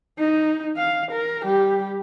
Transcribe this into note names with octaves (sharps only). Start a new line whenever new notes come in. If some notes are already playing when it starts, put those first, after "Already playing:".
D#4
F5
A#4
G3 G4